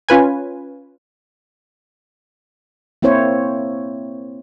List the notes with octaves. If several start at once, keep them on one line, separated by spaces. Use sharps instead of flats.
C#4 F4 B4 G#5
A#3 C4 E4 C5 C#5